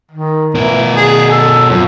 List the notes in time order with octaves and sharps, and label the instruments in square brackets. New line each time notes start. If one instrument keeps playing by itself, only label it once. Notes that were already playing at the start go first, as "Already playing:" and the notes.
[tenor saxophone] D#3
[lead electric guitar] B2 A#4 [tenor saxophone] E3
[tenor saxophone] G#4
A4
[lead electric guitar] F#2 [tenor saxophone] F3